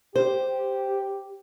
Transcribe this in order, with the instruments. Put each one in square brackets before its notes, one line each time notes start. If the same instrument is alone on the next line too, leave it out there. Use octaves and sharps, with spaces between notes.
[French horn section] G4 [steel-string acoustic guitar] C5